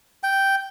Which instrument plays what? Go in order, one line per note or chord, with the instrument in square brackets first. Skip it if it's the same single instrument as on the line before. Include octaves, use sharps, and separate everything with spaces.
[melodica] G5